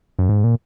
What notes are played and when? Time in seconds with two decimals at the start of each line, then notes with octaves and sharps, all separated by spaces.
0.19 F#2
0.29 G#2
0.44 A#2